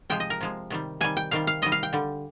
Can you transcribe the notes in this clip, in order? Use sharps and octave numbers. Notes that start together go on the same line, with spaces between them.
C3 F3 G#3 G5
D#5
A#4
C3 F3 G#3
C3 D#3 G3
C3 D#3 G3 G#5
G5
C3 D#3 G3 F5
F5
C3 D#3 G3 D#5
F5
G5
D3 G3